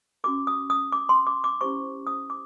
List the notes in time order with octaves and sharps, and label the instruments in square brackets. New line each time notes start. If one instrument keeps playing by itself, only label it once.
[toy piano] C#4 F#4 A4 D6
D#6
D#6
D6
C6
D6
D6
C#4 E4 G4 C5 C#6
D#6
D6